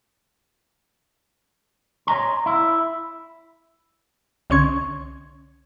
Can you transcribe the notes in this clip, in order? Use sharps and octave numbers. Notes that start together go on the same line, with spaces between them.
C#5 D#5 A5 A#5 C6
E4
C2 D3 C#4 C6 C#6 G#6